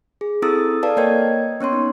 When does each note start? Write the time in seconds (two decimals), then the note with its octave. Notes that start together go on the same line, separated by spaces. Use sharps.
0.21 G#4
0.42 C4 E4 A4 D#6 E6 A6
0.83 A4 B4 D5 F5 A5
0.97 A#3 A#4 C#5 D#5 G5 G#6
1.61 B3 C#4 C#5 C6
1.73 D#4